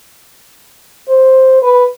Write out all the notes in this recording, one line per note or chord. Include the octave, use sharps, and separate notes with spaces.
C5
B4